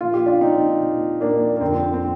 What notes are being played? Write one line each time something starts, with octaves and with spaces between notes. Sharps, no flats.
A#2 F3 F4
G4
D4 F4
A#2 F3 C4 D#4
A#2 F3
A#2 F3 A#3 D4
A#3
F2 D3 F3 C4
C4